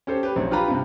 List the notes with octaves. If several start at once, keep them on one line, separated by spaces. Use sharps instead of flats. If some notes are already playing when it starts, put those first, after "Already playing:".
C#4 G4 A4 C5
G4 B4
A#1 F#3 C4 D#4
D4 F4 G4 B4 A#5 B5
G2 C3